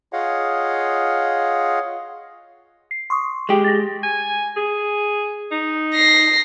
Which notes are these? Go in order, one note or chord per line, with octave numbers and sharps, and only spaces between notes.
F4 G#4 C#5 D#5 F5 F#5
C7
C6 C#6 D#6
G#3 G4
A6 A#6
G#5
G#4
D#4
A#6 C7